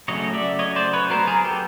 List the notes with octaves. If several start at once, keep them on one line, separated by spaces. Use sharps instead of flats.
C#3 F#3 A3 C#4 C#5 D#5
D5 E5
C#5 D#5
C5 D5
B4 C#5
F#3 B3 A#4 C5
G#4 A#4
G4 A4